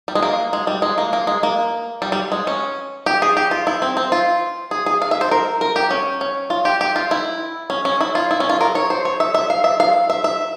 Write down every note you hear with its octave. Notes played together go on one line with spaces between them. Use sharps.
G3
G#3
A#3
G#3
G3
G#3
A#3
A#3
G#3
A#3
G3
G3
G#3
C#4
G4
G#4
G4
F4
E4
C4
C4
F4
G#4
G#4
F5
E5
C5
A#4
A#4
G4
C#4
C#4
F4
G4
G4
F4
E4
C#4
C#4
E4
F4
E4
C#4
F4
A#4
C#5
C5
C#5
E5
E5
F5
E5
F5
E5
E5